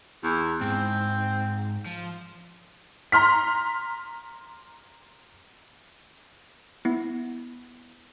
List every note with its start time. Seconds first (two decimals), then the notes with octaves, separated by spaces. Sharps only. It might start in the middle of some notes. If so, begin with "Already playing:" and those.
0.24 E2
0.61 G#2 C4
1.86 F3
3.12 A#5 C6 F6 B6
6.85 B3 E4